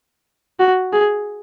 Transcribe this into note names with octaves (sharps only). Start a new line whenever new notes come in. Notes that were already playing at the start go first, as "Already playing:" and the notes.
F#4
G#4